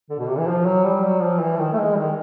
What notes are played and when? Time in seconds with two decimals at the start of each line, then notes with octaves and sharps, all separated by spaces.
0.10 D3
0.19 B2
0.29 C3
0.38 E3
0.48 F3
0.66 F#3
0.84 G3
1.03 F#3
1.22 F3
1.40 E3
1.59 D#3
1.73 A3
1.78 G#3
1.97 D#3